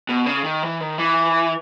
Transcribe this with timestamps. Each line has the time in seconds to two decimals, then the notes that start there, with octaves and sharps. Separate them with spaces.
0.09 B2
0.26 C#3
0.44 D#3
0.63 E3
0.80 D#3
0.98 E3